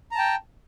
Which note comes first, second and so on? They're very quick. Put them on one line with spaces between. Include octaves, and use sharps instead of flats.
A#5 A5 G5